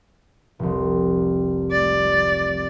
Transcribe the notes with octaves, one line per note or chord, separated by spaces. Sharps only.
F1 C2
D5